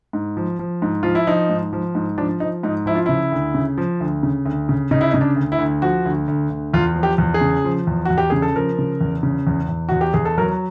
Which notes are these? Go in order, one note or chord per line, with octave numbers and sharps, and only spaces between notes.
G#2
F3
F3
G#2
F3 F4
E4
F3 D#4
G#2
F3
G#2
F3 D4
F3 D#4
G#2 D#4
F3 E4
F4
C#3 E4
D2
C#3
F3
D2
C#3
D2
C#3
C#3 D#4
E4
D#4
C#3
D4
D2
E4
D2
F3 F#4
D2
D2
D2
E2 F4
F3
G4
E2
G#4
C#3
F3
E2
E2 F#4
G4
C#3 G#4
A4
F3 A#4
C#3
E2
C#3
E2
E2
E2 F#4
G4
E2 G#4
A4
F#3 A#4